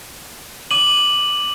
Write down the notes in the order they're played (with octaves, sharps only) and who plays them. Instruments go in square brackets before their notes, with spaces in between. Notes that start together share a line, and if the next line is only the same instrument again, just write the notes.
[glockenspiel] D6 D#7 F#7